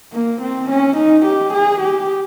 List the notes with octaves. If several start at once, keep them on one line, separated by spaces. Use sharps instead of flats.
A#3
C4
C#4
D#4
G4
G#4
G4